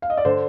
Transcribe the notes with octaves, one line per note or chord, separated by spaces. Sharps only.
F5
D#5
D5
D3 C5